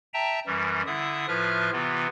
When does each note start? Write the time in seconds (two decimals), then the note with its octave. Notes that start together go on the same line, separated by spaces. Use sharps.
0.14 E5 G5 A5 A#5
0.47 F#2 E3 G3
0.86 D3 E4 E5 D#6
1.28 A2 F3 F4 B4 E5 F6
1.73 C3 E3 B3 F4